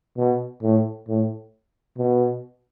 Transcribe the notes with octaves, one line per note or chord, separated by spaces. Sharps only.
B2
A2
A2
B2